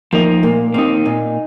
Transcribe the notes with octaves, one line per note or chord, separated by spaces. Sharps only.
F3 A#3 D#4
A#2 A#3
A#3 C4 D#4
A#2 D#4